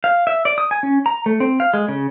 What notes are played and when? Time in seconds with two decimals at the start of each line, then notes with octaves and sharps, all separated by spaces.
0.04 F5
0.27 E5
0.45 D5
0.58 D#6
0.71 G#5
0.83 C#4
1.06 A#5
1.26 A3
1.40 C4
1.60 F5
1.74 G#3
1.89 C#3